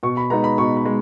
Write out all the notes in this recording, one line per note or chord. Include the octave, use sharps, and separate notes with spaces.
B2 C#6
B5
G#3 B3 D#4 A#5
B5
B2 C#6
B5
G#3